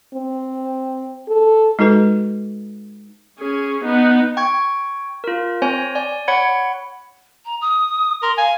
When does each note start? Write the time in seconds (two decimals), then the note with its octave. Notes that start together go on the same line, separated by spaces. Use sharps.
0.14 C4
1.28 A4
1.79 G#3 D#4 F#4 A4 B4
3.39 C#4 G#4
3.85 B3 D#4
4.37 G5 C#6 G#6
5.24 F4 A#4
5.62 C4 C5 C#5 G#5
5.95 D5 G#5
6.28 C#5 F#5 B5 G#6 C#7
7.45 A#5
7.61 D#6
8.22 A#4 C6
8.37 F5 G#5